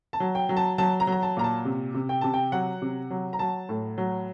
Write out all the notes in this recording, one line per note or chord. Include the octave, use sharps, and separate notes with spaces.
A5
F#3
G5
F#3
A5
F#3 A5
A#5
F#3
A#5
A5
A#2 A#5
A5
C3
C3
G5
C3 A5
G5
F#3 F#5
C3
F#3
A#5
F#3 A5
A2
F#3